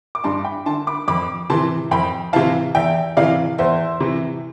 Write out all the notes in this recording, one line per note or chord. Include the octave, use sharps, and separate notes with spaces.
D6
G2 A5 C6
G5 B5
D3 A5 C6
B5 D6
F2 B5 D6
C3 E3 A5 C6
F2 G5 B5
C3 E3 F5 A5
E2 E5 G5
C3 E3 D5 F5
E2 C5 E5
C3 E3